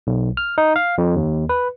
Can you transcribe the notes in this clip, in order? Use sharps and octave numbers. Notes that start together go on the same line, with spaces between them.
B1
F6
D#4
F5
F2
D#2
B4